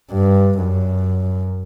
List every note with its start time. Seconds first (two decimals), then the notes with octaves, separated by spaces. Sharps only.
0.13 G2
0.59 F#2